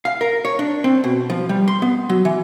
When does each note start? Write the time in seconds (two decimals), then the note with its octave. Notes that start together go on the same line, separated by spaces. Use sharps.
0.05 F5
0.21 A#4
0.45 C#5
0.59 D4
0.84 C4
1.04 B2
1.30 F3
1.49 G3
1.68 C6
1.82 B3
2.09 F#3
2.25 E3